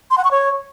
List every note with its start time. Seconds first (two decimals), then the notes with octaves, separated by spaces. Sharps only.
0.11 C6
0.18 F#5
0.24 C#6
0.31 C#5